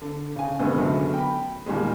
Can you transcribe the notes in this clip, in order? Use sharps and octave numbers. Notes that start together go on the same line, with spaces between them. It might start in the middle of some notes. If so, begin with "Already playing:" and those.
D3
C#3 G#5
D2 G2 C3 D#3 G#3 B3
F#2 D3 F#3 A3 B3
G5 B5
D#2 A#2 G3 G#3